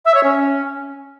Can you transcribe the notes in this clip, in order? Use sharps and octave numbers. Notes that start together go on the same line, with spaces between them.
E5
C#5
C#4